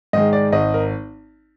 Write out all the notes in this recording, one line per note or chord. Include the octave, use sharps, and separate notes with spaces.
G#2 D#3 G#3 D#5
D5
G#1 D#5
A#4